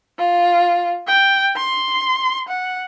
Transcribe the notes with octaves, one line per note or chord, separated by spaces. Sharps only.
F4
G5
C6
F#5